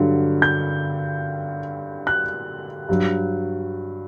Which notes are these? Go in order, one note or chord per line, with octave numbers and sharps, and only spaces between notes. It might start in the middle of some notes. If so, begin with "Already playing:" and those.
Already playing: G2 D3 F#3
G6
F#6
G2 F#3